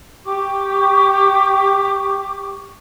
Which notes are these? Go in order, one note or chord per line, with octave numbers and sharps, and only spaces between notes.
G4 C#6 D6